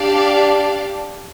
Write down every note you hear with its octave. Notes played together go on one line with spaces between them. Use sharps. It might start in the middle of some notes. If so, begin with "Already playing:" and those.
Already playing: D4 G4 D5 F5